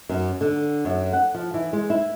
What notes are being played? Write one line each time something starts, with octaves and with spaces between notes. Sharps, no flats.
F#2
D3
F#2
F#5
F3
E3
G#3
E4